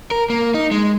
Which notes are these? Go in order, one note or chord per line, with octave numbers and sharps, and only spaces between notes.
A#4
A#3
D#4
G#3